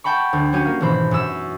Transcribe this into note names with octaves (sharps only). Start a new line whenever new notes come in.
F#5 G5 A5 B5 C#6
D2
F#3 C#4 F#4 G4 D#7
A#3 F5
G#1 B2 E3 C5 B5
F#2 C#4 E6 E7